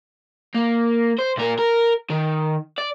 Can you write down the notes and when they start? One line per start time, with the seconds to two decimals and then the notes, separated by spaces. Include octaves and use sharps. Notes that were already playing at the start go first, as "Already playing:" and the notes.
0.55 A#3
1.19 C5
1.37 A#2 A#4
1.59 A#4
2.10 D#3
2.78 D5